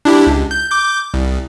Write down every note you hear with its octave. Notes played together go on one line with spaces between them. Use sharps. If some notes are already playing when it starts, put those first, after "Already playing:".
D4 E4 G4
C#2
G6
D6 G6
C2